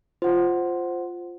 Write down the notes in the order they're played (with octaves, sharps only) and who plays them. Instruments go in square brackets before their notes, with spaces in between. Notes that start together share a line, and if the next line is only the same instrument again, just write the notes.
[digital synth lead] F4 [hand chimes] C5 F#5